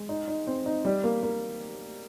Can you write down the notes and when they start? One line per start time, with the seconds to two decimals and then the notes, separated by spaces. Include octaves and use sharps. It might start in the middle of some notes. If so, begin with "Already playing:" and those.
Already playing: G#3
0.09 D#4
0.28 D#4
0.47 C4
0.66 D#4
0.85 G3
1.04 A#3
1.23 A#3